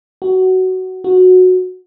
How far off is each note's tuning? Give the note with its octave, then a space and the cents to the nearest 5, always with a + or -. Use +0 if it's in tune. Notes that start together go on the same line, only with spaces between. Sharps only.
F#4 +15
F#4 -10